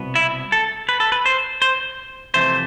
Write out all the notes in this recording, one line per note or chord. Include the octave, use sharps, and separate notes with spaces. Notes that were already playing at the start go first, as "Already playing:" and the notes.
Already playing: C2 B2 B3
E4
A4
B4
A4
B4
C5
C5
F2 C3 E3 A3 C5